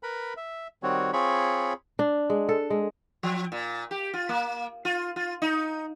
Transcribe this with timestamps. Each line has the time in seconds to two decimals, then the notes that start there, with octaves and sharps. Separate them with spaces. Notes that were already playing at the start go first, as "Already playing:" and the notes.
0.03 A#4 B4 B5
0.37 E5
0.83 D#3 G3 C4 F#4 C#5
1.13 C4 F4 G#4 C#5 B5 C#6
1.99 D4
2.30 G#3
2.49 A4
2.70 G#3
3.23 F3
3.52 A#2
3.91 G4
4.14 F4
4.29 A#3
4.85 F4
5.16 F4
5.42 D#4